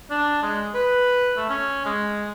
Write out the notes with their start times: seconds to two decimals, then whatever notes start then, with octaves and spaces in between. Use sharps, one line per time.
0.10 D4
0.43 G#3
0.74 B4
1.37 A3
1.49 C#4
1.85 G#3